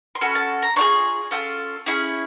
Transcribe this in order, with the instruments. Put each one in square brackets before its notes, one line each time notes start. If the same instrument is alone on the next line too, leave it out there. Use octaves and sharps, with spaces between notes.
[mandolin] C6
C#4 F#4 A4 B5
A5
A#5
D4 F4 G#4 C#6
C#4 F4 A4
C#4 E4 G#4